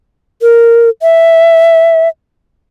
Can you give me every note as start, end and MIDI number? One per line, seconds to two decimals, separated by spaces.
0.42 0.89 70
1.02 2.08 76